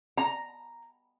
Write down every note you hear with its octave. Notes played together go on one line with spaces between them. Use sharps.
A#5